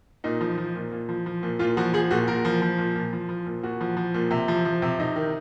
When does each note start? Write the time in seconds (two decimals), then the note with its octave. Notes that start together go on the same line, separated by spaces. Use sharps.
0.24 A#2 D#4
0.41 F3
0.58 F3
0.75 A#2
0.92 A#2
1.09 F3
1.26 F3
1.43 A#2
1.59 A#2 F4
1.77 F3 F#4
1.93 F3 G#4
2.11 A#2 F#4
2.27 A#2 A#4
2.45 F3
2.62 F3
2.78 A#2
2.96 A#2
3.13 F3
3.29 F3
3.46 A#2
3.63 A#2 F#4
3.81 F3
3.97 F3
4.14 A#2
4.31 C3
4.48 F3
4.65 F3
4.82 C3
4.99 C3 D#4
5.16 D#3